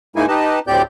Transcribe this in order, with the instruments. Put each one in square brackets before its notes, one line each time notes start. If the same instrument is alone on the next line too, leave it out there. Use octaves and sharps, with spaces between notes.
[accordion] G#2 G#3 A#3 D#4 E4 G#5
D#4 G4 B4 D#5 A5
D2 A2 C4 G4 D5 G6